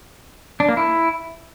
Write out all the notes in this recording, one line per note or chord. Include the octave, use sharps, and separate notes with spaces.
D4
A#3
E4